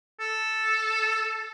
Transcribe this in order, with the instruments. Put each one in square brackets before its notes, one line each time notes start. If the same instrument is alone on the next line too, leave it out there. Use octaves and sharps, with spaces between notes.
[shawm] A4